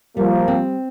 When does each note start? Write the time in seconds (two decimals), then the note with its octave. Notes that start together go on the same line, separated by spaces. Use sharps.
0.17 F3 G3 A#3
0.48 C4